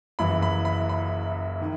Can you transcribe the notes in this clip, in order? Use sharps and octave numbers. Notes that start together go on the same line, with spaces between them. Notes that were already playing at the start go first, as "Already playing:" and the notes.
F#1 F#2 E3 B5
B5
B5
B5
D#3